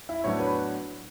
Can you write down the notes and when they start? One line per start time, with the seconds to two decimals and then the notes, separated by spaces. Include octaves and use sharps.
0.09 E4
0.24 A2 F#3 B3 D4 C#5
0.40 B4